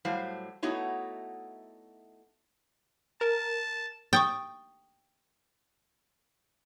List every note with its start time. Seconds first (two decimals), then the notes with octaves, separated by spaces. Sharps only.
0.05 A2 F#3 G3 C5 F5
0.63 A3 B3 D#4 E4 F#4 C#5
3.21 A#4 A5
4.13 G5 C#6 D#6 A6